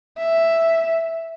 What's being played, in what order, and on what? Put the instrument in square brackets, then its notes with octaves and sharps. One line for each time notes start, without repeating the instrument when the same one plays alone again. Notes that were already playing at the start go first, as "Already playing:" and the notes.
[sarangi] E5